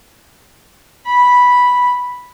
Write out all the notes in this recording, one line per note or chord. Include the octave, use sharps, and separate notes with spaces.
B5